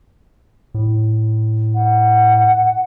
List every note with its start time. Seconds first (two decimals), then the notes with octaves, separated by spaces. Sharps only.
0.74 A2
1.74 F#5